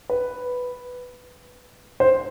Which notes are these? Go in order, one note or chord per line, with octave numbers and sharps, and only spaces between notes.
B4
C5